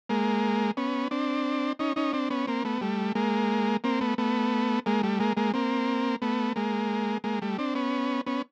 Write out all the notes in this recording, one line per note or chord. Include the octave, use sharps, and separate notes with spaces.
G#3 A#3
B3 C#4
C4 D4
C#4 D#4
C#4 D#4
C4 D4
B3 C#4
A#3 C4
A3 B3
G3 A3
G#3 A#3
A#3 C4
A3 B3
A3 B3
G#3 A#3
G3 A3
G#3 A#3
G#3 A#3
A#3 C4
A3 B3
G#3 A#3
G#3 A#3
G3 A3
C4 D4
B3 C#4
B3 C#4